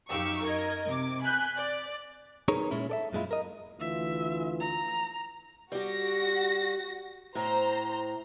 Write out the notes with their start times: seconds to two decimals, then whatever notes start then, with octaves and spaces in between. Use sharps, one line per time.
0.10 F#2 D#4 G4 F5 C#6 E6
0.44 A#4 D#5 G#6
0.86 C3 D6
1.22 G#5 B5 F#6 G6
1.57 D5
2.48 D#4 G#4 A#4 B4 C#5
2.71 A#2 G#3 C#4 E4
2.90 A4 D5 E5
3.13 F#2 A#2 G#3 C#4 E4 F4
3.31 A#4 D#5
3.80 D2 E3 F4 E5
4.60 A#5
5.72 G3 F#4 G4 A#6
7.35 A2 C5 A#5